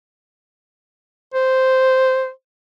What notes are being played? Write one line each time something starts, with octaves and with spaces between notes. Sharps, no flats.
C5